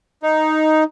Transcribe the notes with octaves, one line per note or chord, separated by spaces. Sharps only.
D#4